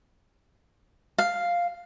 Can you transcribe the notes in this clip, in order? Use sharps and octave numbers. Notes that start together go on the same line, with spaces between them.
F5